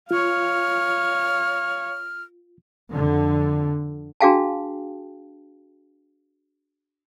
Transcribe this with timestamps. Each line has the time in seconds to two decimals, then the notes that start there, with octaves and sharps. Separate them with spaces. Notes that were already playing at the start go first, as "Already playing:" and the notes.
0.11 F4 C#5 F5 F6
2.93 F2 D3
4.21 D4 F#4 G#4 F5 G5 A5